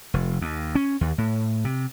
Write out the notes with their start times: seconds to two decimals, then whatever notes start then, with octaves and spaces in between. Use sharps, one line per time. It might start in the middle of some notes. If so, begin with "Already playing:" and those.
0.14 F1
0.41 D#2
0.75 C#4
1.01 D#2
1.18 A2
1.65 C3